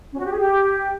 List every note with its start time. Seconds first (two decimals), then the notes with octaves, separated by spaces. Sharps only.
0.12 C#4
0.19 F#4
0.25 G4
0.31 G#4
0.38 G4